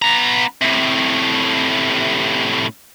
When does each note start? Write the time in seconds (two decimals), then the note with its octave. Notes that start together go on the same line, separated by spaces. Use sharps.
0.02 B3 A#5
0.62 A2 C3